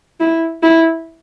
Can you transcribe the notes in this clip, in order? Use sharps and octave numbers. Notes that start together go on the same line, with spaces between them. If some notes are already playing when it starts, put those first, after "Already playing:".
E4
E4